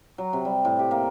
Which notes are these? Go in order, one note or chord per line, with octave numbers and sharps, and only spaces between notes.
F#3
C3
G3
A2
G4
A#3